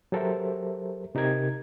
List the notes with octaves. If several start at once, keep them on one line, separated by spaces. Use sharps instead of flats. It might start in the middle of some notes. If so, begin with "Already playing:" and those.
F#3 G4 A4 A#4 C5 E5
C3 D#4 G4 A#4 G#6